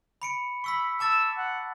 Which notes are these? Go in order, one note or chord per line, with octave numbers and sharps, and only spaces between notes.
B5 C#7 D7
B5 C#6 E6 B6
A5 D6 E6 A6
F#5